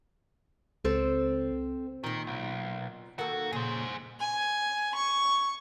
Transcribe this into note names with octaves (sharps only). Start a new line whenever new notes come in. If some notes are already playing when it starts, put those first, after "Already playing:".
C#2 C4 A4 C5
A#2 D#3 D#4
B1
D#3 A#3 F#4 A4
F2 A#2 C#3 G#4 C5
G#5
C#6